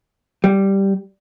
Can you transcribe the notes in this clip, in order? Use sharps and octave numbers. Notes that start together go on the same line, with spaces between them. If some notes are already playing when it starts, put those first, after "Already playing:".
G3